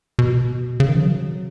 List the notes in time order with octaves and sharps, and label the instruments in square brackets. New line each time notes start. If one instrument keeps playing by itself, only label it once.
[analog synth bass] B2
C#3
D#3
F3
F#3